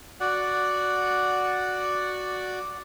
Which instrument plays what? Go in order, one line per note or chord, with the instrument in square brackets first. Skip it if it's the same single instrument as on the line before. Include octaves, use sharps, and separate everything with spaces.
[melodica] F#4 D5 F#5